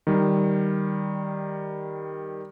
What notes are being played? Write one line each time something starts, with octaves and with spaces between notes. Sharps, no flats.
D#3 G3